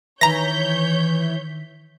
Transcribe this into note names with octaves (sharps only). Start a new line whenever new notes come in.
D#3 E3 C#5 A#5 G6 A#6 B6